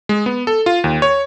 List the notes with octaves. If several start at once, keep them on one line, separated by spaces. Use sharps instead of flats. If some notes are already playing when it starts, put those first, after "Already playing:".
G#3
B3
A4
F4
D#2
C#5